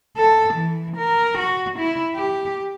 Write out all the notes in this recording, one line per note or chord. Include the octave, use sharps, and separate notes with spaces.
A4
E3
A#4
F#4
E4
G4